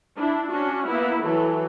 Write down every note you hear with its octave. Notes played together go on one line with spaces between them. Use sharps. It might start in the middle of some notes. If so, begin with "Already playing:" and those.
D4 E4
C#4 D4 F#4
A#3 B3 E4
E3 F#3 A4